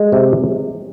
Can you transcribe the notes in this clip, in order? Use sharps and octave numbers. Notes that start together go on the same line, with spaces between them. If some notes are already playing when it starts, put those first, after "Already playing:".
Already playing: G#3
C3